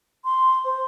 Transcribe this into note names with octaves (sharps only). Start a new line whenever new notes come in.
C6
C5